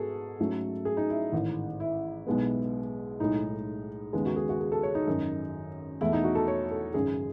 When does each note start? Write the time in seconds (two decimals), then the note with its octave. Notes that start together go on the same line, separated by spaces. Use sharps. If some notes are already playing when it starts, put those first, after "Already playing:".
Already playing: G#2 B3 F#4 G#4 A4
0.39 G#2 F#3 A3 C#4
0.85 G#4
0.97 D#4
1.10 E4
1.32 A1 G#2 D#3
1.80 E4
2.27 B1 B2 G#3 B3
3.20 B1 A2 G#3 D#4
4.13 D#2 C#3 G#3 B3
4.26 F#4
4.36 G#4
4.49 F#4
4.60 G#4
4.72 A4
4.83 C#5
4.95 D#4
5.07 G#1 F#2 D#3
6.01 E2 B2 A3 E4
6.13 D#4
6.24 F#4
6.35 A4
6.48 C#5
6.71 A4
6.94 G#1 F#2 C#3 G#4